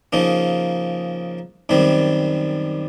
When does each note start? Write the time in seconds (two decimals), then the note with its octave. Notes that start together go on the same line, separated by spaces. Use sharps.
0.13 C#3 F3 A#3 D#4
1.69 F#2 D#3 G3 C4